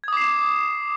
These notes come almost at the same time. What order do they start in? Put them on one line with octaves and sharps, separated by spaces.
G#6 D#6 D6 C7 E7